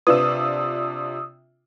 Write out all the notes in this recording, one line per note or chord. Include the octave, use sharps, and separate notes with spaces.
C3 D4 F4 B4 D#6 E6